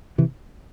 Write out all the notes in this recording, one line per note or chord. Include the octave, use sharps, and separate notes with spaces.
C3 E3